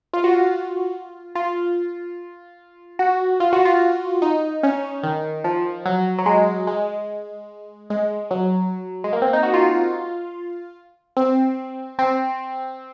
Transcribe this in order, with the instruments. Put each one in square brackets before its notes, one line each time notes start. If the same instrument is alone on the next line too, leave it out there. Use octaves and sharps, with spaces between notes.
[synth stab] F4
F#4
F4
F4
F#4
F4
F#4
F4
D#4
C#4
D#3
F3
F#3
F#3
G#3
G#3
G#3
F#3
G#3
A#3
C4
D#4
F#4
F4
C4
C4